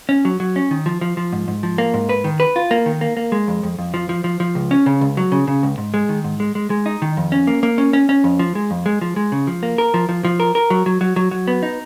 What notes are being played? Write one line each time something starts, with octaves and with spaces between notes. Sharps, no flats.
C#4
F#3
F#3
C#4
D#3
F3
F3
F3
G#2
G#2
F3
A#3
G#2
B4
D#3
B4
F4
A#3
D#3
A#3
A#3
G#3
F2
F2
F2
F3
F3
F3
F3
C#2
C#4
C#3
C#2
F#3
C#3
C#3
C#2
G#2
G#3
D#3
G#2
G#3
G#3
G#3
D#4
D#3
F2
C#4
A#3
A#3
C#4
C#4
C#4
F2
F3
G#3
F2
G#3
F3
G#3
C#3
F3
A#3
A#4
F3
F3
F3
A#4
A#4
F#3
F#3
F#3
F#3
F#3
B3
D#4